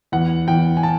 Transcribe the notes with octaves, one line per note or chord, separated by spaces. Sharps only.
E2 F#5
E2 G5
G#5
A5